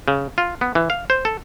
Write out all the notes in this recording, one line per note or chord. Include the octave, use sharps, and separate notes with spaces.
C#3
F4
B3
E3
F5
C5
A4